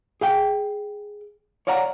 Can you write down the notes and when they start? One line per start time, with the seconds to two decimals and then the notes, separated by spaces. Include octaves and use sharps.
0.21 G#4 F5 G5
1.67 C#5 D5 F5 F#5 A#5